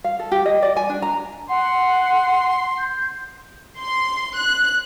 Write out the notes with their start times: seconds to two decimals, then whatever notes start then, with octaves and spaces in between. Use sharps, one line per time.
0.04 F5
0.19 A4
0.32 G4
0.46 D#5
0.62 D5
0.77 G#5
0.90 D4
1.02 A#5
1.49 F#5 C6
2.78 G6
3.79 C6
4.37 F#6